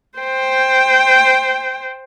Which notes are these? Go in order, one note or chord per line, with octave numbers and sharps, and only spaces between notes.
C5 G5